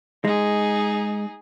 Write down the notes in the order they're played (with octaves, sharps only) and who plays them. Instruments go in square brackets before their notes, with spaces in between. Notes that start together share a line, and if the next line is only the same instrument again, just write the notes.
[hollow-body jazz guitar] G#3 [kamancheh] D#4 G#4